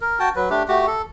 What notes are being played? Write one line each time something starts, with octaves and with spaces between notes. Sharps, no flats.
A#4
F#4 G5 A5
F#3 B4
A3 D4 G4
A3 F#4 G4
A4